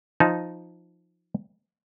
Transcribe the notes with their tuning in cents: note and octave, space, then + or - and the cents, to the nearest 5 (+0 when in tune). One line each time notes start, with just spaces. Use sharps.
F3 +0 D#4 +0 A5 -25